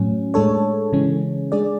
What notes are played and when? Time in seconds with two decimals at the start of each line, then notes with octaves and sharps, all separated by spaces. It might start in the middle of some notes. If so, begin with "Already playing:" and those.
Already playing: A2 F#3 C#4
0.34 A2 G#3 D4 A4 C#5
0.93 C#3 E3 G#3 C#4
1.52 G#3 D4 G#4 D5